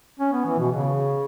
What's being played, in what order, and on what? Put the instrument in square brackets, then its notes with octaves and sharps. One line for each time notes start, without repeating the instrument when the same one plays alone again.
[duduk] C#4
B3
E3
B2
C#3